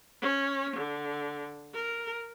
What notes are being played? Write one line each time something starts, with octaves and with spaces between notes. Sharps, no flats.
C#4
D3
A#4